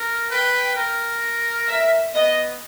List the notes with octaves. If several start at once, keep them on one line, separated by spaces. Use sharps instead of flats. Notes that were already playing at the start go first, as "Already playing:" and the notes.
Already playing: A#4
B4 G5
A#4
E5
B3 D#5